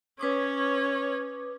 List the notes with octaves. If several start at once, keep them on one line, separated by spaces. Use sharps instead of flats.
C#4 B4 C#5 D6 D#6